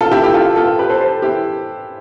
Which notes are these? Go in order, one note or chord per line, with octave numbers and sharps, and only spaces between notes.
F4 A4
E4 G4
E4 G4
F4 A4
F4 A4
G4 B4
A4 C5
A4 C5
E4 G4